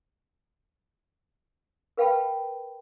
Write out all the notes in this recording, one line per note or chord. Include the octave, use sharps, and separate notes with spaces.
A#4 B4 F5 G5 A5 B5